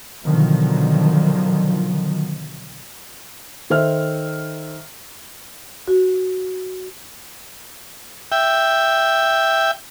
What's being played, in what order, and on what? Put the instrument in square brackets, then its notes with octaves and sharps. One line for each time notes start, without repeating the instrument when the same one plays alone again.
[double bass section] B2 D3 D#3 F3 F#3
[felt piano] D#3 A4 C5 E5 F6
[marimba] F#4
[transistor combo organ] E5 G5